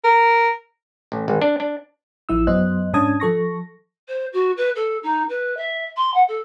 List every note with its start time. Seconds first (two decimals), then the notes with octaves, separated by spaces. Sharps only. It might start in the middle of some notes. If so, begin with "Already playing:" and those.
0.04 A#4
1.12 A1
1.28 G#1
1.42 D4
1.60 D4
2.29 A1 F3 E4 E6
2.47 F#2 F#3 B3 C5 D#5 F#6
2.93 G#2 C#4 D4 A5 D#6 G#6
3.20 F3 A4 C#6 A#6
4.08 C5
4.32 F#4
4.56 B4
4.75 A4
5.02 D#4
5.28 B4
5.57 E5
5.96 C6
6.13 F#5
6.28 A4